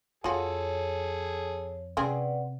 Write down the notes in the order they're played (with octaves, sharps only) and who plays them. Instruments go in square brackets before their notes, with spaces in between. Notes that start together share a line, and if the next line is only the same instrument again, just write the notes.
[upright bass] F2 [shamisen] F4 F#4 [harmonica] G#4 A4 [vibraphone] C#5
[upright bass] C3 [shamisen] C4 C#4 G#4 [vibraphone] B4 D5 F#5